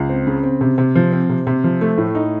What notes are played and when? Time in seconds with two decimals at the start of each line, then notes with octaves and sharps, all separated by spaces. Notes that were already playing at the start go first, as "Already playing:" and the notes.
Already playing: C#2
0.09 C4
0.27 C#3
0.43 C4
0.61 C3
0.78 C3
0.95 F3
1.12 C4
1.29 C3
1.47 C3
1.64 F3
1.81 A3
1.98 A2
2.15 D#4